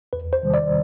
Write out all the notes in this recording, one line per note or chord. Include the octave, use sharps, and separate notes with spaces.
E2 B4
C5
C3 D#3 G3
D5